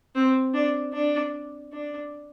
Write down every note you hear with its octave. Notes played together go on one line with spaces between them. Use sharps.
C4
D4
D4
D4